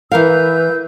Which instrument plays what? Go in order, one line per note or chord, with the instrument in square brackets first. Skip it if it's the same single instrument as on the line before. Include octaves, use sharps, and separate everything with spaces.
[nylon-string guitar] E3 A#4 F5 [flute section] B4 E6 G6